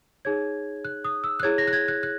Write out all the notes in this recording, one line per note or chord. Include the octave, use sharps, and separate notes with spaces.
D#4 G#4 C#5 G#6
F#6
D#6
E6
F#6
E4 G#4 C#5 G#6
A#6
F#6
G#6
F#6
F#6